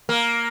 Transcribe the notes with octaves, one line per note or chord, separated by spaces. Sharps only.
A#3